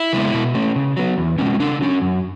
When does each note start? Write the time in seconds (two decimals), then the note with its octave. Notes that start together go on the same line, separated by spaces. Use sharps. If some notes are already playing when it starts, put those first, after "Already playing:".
Already playing: E4
0.13 C#3 G#3 B3
0.34 B2
0.54 A3 C#4
0.76 C#3
0.97 F#3 B3
1.18 E2
1.38 B2 G#3 C#4
1.60 C#3 D4
1.81 F#3 C#4
2.02 F#2